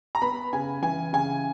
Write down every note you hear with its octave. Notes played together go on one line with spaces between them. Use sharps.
A#5
B3 B5
C#3 G#5
E3 G#5
C#3 G#5